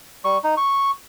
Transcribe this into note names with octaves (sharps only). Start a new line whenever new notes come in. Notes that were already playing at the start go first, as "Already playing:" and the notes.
G3 C#6
D#4
C#6